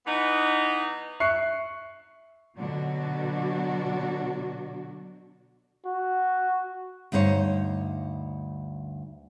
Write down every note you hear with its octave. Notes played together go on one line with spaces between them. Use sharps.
E3 B3 D#4
E5 C#6 F#6 C7 C#7
B2 D3 F#3 D4 F#4
F#4
D2 G2 D#4 C5 C#5